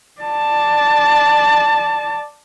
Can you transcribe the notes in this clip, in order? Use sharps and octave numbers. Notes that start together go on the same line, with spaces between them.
D5 A5